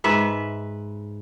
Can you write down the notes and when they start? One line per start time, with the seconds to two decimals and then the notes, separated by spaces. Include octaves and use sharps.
0.04 G#2 B4 E5